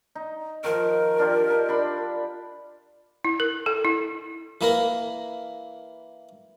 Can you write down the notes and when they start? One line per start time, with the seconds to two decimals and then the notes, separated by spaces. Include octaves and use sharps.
0.15 D#4
0.64 D#3 F3 A#4
1.19 D4 F4 G4
1.50 D#4
1.69 D4 B5 C6
3.25 E4
3.40 A#4
3.66 A4
3.85 E4
4.61 E3 A#3 E4 A#4